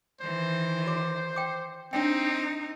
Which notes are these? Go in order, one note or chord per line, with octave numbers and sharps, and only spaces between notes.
D#3 E3 C5
F#4 D6
G5 D6
C4 D4 D#4 G5